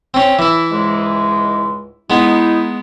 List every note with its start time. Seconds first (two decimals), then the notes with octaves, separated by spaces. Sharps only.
0.14 C4 C#4
0.39 E3 E4
0.71 C#2 G#2 G#3
2.10 G#3 B3 D#4 E4